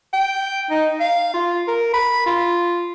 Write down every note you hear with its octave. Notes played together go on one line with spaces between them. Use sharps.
G5
D#4
F5
F4
A#4
B5
F4